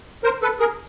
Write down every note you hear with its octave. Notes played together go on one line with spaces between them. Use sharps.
A#4 C5
A4 B4
G#4 A#4